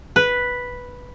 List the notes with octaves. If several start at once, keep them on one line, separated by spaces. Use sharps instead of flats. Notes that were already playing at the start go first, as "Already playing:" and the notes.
B4